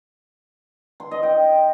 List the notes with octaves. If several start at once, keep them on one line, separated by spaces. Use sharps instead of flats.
C6
D#5
G5